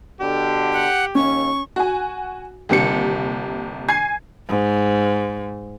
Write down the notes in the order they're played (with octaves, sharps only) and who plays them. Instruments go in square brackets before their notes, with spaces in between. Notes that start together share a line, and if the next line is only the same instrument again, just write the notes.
[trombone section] B2 D3 [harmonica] G4
[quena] F#5
[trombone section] D#2 [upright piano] C#4 [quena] C#6
[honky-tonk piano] F#4 G#5
G1 D#2 C3 C#7
G#5 G#6 C7
[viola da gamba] G#2